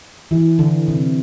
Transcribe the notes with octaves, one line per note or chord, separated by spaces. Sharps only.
E3
D3
C3